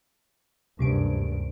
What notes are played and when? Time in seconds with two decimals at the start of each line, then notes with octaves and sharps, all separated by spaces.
0.79 F#1 D2 G2 C3 D7